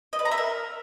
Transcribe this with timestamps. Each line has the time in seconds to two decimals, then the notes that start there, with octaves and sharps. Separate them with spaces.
0.13 D#5
0.19 B4
0.25 A#5
0.31 E5
0.38 A#4